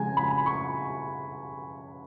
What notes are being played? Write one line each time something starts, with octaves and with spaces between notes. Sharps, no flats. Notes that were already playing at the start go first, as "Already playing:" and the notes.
Already playing: C#3 F3 G#3 G#5 A#5
B5
C#6